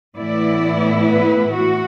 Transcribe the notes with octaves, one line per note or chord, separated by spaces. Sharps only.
A2 E3 B3 E4 D5
B4
F#4